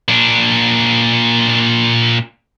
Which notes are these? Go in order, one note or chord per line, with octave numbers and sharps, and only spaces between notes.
A#2 D4